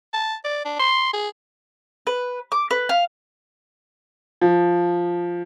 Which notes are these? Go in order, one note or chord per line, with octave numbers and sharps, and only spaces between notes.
A5
D5
D4
C6
G#4
B4
D6
B4
F5
F3